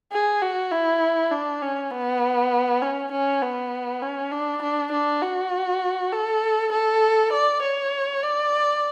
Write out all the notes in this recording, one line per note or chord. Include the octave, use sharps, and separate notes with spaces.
G#4
F#4
E4
D4
C#4
B3
C#4
C#4
B3
C#4
D4
D4
D4
F#4
A4
A4
D5
C#5
D5